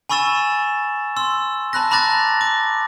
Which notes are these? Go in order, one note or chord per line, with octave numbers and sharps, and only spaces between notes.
G#5 B5 C#6 E6 A6 E7
C6 E6
A5 B5 F#6 A#6
A#5 B5 D6 F#6 A6 A#6
D6